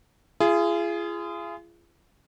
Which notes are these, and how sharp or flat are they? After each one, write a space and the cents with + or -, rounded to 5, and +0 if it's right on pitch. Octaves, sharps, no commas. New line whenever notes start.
F4 -40 G#4 +0